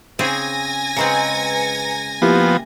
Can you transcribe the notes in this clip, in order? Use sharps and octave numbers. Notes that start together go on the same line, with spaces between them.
C#3 C4 G#4 G#5 G#6 A#6
C#3 G#3 C4 B4 A#5 C#7
F3 A#3 B3 E4 G4